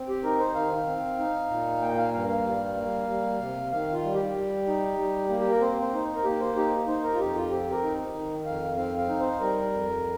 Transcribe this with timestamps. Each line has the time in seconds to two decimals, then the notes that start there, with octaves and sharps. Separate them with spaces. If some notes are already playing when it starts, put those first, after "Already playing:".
Already playing: C4
0.08 G4
0.24 D#4 A#4
0.40 C5
0.55 D#3 F5
0.87 C4
1.18 D#4
1.50 A#2
1.81 A#3 G5
1.97 F5
2.13 G2 F5
2.29 F5
2.45 G3
2.76 A#3
3.08 G3
3.40 C3
3.72 D#3 F5
3.93 F4
4.04 G3
4.14 G4
4.35 G3
4.66 D#4
4.98 G3
5.29 A#3
5.40 G4
5.51 A#4
5.61 C4 C5
5.82 C5
5.93 D#4
6.15 A#4
6.24 A#3 G4
6.41 C5
6.56 D#4 G4
6.87 D#4 C5
7.04 A#4
7.14 F4
7.19 F2 G4
7.35 F4
7.50 C4 G4
7.71 A#4
7.82 D#4
8.14 D#3
8.46 F2 F5
8.77 C4 F5
8.98 F5
9.09 D#4
9.20 C5
9.40 G3 A#4
9.72 F2